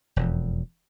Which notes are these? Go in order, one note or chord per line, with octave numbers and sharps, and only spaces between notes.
E1 F2